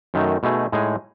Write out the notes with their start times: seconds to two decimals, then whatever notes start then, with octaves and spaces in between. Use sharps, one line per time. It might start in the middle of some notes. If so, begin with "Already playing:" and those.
0.14 F#2 D#3 A3 D#4
0.43 B2 A3 D#4 G#4
0.72 A2 G#3 D#4 G#4